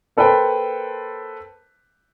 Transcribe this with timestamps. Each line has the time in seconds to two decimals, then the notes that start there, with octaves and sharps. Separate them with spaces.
0.17 A#3 A4 B4 C5 G5